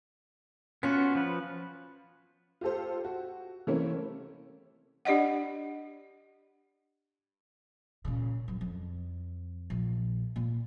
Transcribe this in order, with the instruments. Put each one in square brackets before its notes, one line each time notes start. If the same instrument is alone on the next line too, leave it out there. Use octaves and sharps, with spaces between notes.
[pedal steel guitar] B3 F4 F#4 [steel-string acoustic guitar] C#4
[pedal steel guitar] F3 B4
[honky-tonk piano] F4 G4 A4 C5
F#4
E3 G3 A3 A#3 C4 C#4
[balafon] D4 G4 D5 D#5 F#5
[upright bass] A#2 C#3
F#2
F2
A#1
A#2